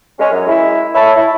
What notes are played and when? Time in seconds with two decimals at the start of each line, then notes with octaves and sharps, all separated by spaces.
0.19 G#3 C#4
0.31 F#2
0.47 G#3 E4
0.93 A3 C#5 E5 A5 B5
1.16 E4